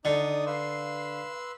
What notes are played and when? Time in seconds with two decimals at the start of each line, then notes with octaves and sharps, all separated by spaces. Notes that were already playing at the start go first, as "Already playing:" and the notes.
0.05 D3 D#4 D5 D#6
0.47 B4 F5 C6 E6